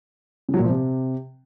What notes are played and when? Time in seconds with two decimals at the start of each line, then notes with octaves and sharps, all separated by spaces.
0.49 C#3
0.54 F#3
0.59 A#2
0.64 F3
0.70 C3